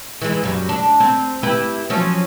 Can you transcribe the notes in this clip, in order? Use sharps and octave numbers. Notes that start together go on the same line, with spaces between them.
E3 G#3
F#2 G3
D4
C4
E4 G4 B4
F3 F#3 C#4